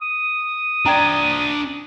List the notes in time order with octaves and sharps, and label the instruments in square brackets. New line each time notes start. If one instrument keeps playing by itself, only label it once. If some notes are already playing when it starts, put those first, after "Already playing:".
[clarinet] D#6
[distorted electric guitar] D4 C5 [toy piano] D5 G5 A#5